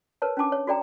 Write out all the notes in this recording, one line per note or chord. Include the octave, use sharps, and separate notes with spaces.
A#4 B4 C#5 A5
C#4 D4 A5 D6
C#5
F#4 A4 D5 G5 A#5